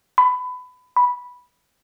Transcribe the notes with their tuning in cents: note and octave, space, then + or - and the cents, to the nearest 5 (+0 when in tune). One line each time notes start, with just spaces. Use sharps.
B5 +20
B5 -10